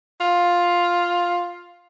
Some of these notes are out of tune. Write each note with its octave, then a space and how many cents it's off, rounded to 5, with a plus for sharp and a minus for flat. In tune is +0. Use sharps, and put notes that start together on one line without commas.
F4 +5